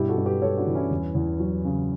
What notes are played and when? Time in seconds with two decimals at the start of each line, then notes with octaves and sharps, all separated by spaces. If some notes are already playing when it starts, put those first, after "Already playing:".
Already playing: G2 B2 E4 G4
0.09 F#4 A4
0.18 G2
0.26 G4 B4
0.42 G3 A4 C#5
0.57 D4 F#4
0.66 E3
0.74 C#4 E4
0.90 E2
1.15 E2
1.40 F#3
1.65 C#3